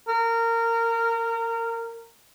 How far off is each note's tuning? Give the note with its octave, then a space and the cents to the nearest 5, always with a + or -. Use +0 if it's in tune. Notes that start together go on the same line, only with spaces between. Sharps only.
A#4 -20